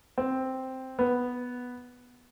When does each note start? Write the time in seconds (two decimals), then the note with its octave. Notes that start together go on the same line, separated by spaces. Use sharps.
0.18 C4
0.99 B3